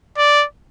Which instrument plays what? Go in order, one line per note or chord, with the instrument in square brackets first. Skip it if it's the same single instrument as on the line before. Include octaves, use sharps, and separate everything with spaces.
[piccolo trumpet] D5